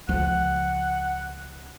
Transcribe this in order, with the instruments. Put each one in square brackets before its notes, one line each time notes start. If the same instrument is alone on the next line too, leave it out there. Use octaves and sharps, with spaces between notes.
[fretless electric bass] C#2 F3 [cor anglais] F#5